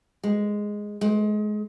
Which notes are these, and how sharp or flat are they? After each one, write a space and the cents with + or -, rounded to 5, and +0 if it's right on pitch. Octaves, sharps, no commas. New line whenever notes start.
G#3 -5
G#3 +25